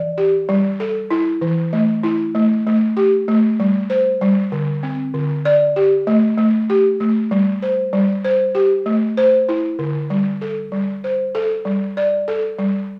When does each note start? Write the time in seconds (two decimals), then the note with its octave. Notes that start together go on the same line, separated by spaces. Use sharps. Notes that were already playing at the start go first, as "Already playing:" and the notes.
Already playing: E3 D5
0.18 G4
0.49 G3
0.80 A4
1.11 E4
1.41 E3
1.73 A3
2.03 E4
2.35 A3
2.67 A3
2.97 G4
3.28 A3
3.60 G3
3.90 C5
4.21 G3
4.52 D3
4.83 C4
5.14 D3
5.45 D5
5.76 G4
6.07 A3
6.38 A3
6.70 G4
7.00 A3
7.31 G3
7.62 C5
7.93 G3
8.25 C5
8.55 G4
8.86 A3
9.17 C5
9.49 E4
9.79 D3
10.10 G3
10.41 A4
10.72 G3
11.04 C5
11.35 A4
11.65 G3
11.97 D5
12.28 A4
12.59 G3